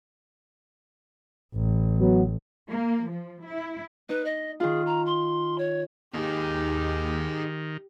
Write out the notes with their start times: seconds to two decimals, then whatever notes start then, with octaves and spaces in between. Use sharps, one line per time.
1.55 A1
1.99 F#3 B3
2.69 A#3
3.09 F3
3.45 E4
4.09 D#4 B4
4.25 D#5
4.60 D#3 F4 G#4
4.86 A#5
5.06 C6
5.58 C#5
6.14 D#2 D#3 D#4 G4 G#4